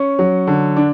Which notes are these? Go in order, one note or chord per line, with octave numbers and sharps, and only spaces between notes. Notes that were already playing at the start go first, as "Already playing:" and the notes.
Already playing: C#4 C#6
F#3
D3
D4